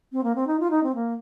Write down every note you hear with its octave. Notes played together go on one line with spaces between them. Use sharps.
C4
A#3
C4
D#4
F4
D#4
C4
A#3